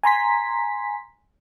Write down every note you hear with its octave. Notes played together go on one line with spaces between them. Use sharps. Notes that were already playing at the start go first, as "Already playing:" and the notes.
G#5 A#5 C6 B6